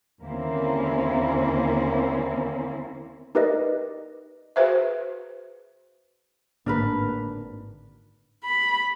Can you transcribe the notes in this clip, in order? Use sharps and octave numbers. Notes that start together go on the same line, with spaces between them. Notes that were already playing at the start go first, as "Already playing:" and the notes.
D#2 D3 A#3 C4 C#4 E4
D#4 G4 A#4 B4 D5 D#5
F#4 G#4 B4 C5 E5
G#1 A2 D3 A#3 D4 A#4 B4
B5